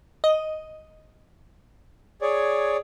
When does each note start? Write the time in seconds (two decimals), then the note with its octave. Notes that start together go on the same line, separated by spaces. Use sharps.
0.24 D#5
2.22 G#4 C#5 D5